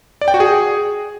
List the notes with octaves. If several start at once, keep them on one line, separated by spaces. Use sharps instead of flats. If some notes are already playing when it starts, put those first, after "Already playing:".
D5
G5
F#4
G#4